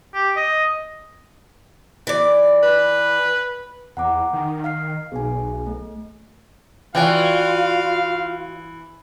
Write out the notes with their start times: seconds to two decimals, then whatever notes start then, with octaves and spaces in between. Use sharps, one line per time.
0.14 G4
0.37 D#5
2.07 E3 D5
2.63 B4
3.97 E2 F#5 A#5 D6
4.33 D#3
4.64 F5 F6 C7
5.12 B1 G#4 G#5
5.66 A3
6.95 E3 F4 F#4 D5 F5 G5